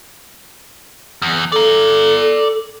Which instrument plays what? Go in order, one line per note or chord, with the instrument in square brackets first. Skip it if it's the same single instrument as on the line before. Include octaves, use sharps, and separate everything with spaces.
[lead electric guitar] E2
[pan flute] A4 [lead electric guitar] D5 A#5